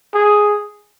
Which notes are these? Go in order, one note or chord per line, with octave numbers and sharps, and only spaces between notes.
G#4